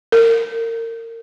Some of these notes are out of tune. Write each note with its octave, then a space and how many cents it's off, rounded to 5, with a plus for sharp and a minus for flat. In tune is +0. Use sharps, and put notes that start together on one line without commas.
A#4 -30